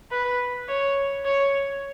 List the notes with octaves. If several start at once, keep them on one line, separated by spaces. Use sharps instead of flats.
B4
C#5
C#5